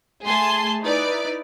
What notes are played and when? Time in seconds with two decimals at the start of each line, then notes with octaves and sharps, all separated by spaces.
0.25 A3 G#4 G#5 A5 C6
0.82 D#4 E4 B4 D5